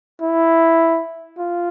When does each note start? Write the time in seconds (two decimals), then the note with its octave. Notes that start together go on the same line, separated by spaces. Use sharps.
0.21 E4
1.38 F4